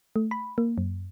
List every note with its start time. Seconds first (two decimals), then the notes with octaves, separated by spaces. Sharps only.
0.16 A3
0.31 B5
0.58 A#3
0.78 F#2